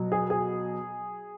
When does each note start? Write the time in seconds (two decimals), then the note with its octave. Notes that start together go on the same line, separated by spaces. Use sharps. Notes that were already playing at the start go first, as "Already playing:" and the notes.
Already playing: B2 F#3
0.12 G#4
0.30 G#4